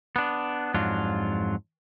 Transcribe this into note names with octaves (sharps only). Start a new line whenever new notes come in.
B3 D4
F2 G#2 F#3 D4 F4